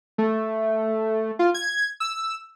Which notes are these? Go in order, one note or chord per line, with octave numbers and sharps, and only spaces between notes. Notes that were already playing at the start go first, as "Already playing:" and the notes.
A3
F4
G#6
E6